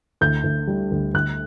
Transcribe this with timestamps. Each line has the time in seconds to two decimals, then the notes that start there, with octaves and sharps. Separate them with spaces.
0.21 D2 G6
0.44 D2
0.67 G3
0.91 D2
1.14 D2 F#6